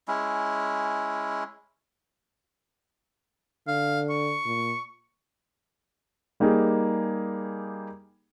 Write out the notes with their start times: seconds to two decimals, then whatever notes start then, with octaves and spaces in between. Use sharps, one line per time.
0.08 G#3 C#4 E4
3.68 D3 F5
4.10 C#6
4.45 A#2
6.40 G3 A#3 D#4 G4 G#4